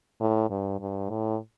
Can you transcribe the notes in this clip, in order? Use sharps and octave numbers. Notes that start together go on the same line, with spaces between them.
A2
G2
G2
A2